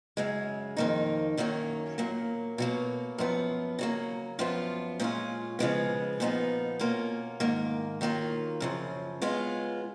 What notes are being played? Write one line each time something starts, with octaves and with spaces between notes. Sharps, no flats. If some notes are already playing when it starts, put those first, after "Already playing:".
F#2 C#3 G#3
F2 D#3 F#3 A#3 D#4
F#2 D#3 F#3 A#3 C#4
A#2 F#3 A#3
B2 F#3 A#3
F#2 F3 B3
C#3 F#3 A#3
F#2 F3 B3 F4
A#2 G#3 C#4 F4
C#3 F3 G#3 B3
A#2 F3 B3 D#4
B2 A#3 C#4 F4
G#2 D#3 A#3
D#3 F#3 A#3 F4
F#2 C#3 F3
C#3 G#3 B3 F4